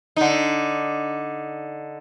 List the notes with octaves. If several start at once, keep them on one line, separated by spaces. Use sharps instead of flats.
D3 D#4